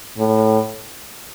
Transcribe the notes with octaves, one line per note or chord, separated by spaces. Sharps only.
A2